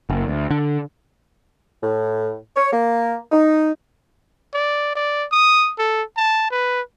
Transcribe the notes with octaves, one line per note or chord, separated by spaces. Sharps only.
F#1
D2
D3
A2
C#5
A#3
D#4
D5
D5
D#6
A4
A5
B4